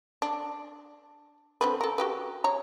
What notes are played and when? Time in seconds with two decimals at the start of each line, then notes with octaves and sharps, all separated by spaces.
0.22 D4
1.61 D3 C4 B4
1.81 A4 A#4
1.98 F#4 G4 B4
2.44 C#5 A#5